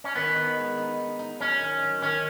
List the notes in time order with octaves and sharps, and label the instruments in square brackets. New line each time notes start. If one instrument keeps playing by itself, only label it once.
[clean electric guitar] C#4
[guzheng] D#3 [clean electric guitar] B3
[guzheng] D#4
G#3
D#4
D#4
D#4
[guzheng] F#3 [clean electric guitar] C#4
[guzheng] D#3
F#3
[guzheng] D#3 [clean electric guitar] C#4